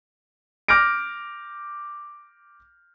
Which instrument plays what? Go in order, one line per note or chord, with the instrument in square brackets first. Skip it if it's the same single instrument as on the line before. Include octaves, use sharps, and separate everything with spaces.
[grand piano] D6 F6 G6 A#6 D7